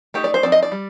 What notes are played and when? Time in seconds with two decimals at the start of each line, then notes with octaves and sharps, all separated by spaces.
0.14 A3 D#4 G4
0.24 D5
0.34 C5
0.43 F3 C4 D#4 D5
0.52 D#5
0.63 D5
0.72 G3